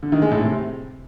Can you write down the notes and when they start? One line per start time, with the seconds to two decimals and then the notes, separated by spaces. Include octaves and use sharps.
0.03 D3
0.12 D#3
0.22 G#3
0.31 A2
0.41 C3